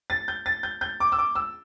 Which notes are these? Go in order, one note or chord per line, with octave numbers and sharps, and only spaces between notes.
A6
G6
A6
G6
G6
D6
E6
D6
E6